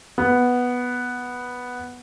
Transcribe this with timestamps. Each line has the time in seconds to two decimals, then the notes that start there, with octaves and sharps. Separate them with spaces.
0.18 B3